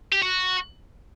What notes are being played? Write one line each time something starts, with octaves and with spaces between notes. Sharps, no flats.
G4
F#4